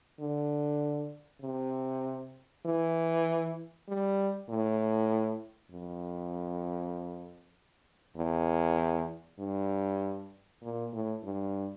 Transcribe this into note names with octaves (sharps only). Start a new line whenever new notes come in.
D3
C3
E3
G3
A2
F2
E2
G2
A#2
A2
G2